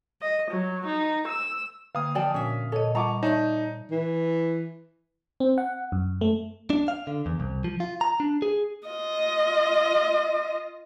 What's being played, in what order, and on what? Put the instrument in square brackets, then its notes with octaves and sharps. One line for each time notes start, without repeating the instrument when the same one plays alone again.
[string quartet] D#5
F#3
D#4
E6
[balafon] D3 A#3 [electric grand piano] F5 D#6
[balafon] F3 F#4 [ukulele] D5 G5 A5
[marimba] A#2 [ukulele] C#4 D4 E5
[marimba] A#2 D#5 [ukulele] A4 C#5
[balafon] G3 F4 F#5 [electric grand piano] A5 C#6 D6 [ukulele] A#5
[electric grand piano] D#4 [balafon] C#5 E5 C#6 [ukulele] D5 A5
[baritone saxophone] E3
[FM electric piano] C4
F#5
F#2
A3
[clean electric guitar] D4
F5
D3
E2
C2
F3
F4
A#5
D4
G#4
[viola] F4 D#5